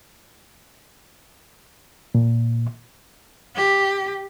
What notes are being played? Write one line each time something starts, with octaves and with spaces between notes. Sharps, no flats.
A#2
G4